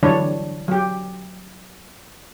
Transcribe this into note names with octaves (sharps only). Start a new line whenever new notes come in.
D3 E3 F#3 G3 D4 C#5
F#3 G4